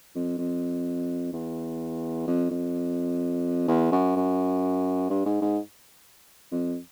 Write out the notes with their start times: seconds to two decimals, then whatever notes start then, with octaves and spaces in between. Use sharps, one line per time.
0.16 F2
0.38 F2
1.33 E2
2.27 F2
2.51 F2
3.68 E2
3.92 F#2
4.16 F#2
5.10 G2
5.26 G#2
5.42 G#2
6.52 F2